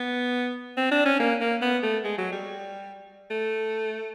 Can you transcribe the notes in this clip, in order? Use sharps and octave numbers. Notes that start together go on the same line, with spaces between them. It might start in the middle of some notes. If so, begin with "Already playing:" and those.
Already playing: B3
C4
D4
C#4
A#3
A#3
B3
A3
G#3
F#3
G3
A3